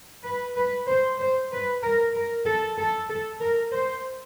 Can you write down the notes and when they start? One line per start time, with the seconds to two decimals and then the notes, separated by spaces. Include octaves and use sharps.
0.24 B4
0.56 B4
0.87 C5
1.19 C5
1.51 B4
1.83 A#4
2.14 A#4
2.46 A4
2.78 A4
3.10 A4
3.40 A#4
3.73 C5